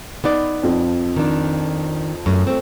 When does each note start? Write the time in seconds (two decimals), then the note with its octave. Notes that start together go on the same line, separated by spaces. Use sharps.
0.24 B3 D#4 D5
0.63 F2 F3
1.16 D#3 D4
2.26 F#2 A3
2.47 A3 C4